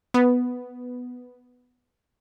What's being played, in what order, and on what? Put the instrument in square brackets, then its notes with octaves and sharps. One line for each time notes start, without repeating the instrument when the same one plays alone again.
[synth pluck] B3